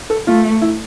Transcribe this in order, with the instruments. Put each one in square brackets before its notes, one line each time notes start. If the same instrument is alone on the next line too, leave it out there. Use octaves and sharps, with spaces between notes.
[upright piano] A4
[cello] A3 [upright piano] F4
[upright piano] E4